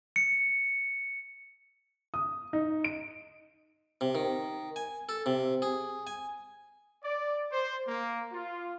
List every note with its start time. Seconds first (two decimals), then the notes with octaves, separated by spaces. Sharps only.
0.16 C#7
2.14 D#6
2.53 D#4
2.84 D7
4.01 C3
4.15 D#3
4.76 G#5
5.09 A4
5.26 C3
5.62 G#4
6.07 G#5
7.04 D5
7.52 C5
7.88 A#3
8.32 F4